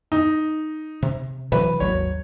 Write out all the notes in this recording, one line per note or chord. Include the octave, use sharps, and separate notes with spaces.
D#4
C3
C3 E3 F#3 B4
G#1 D#2 F#3 C#5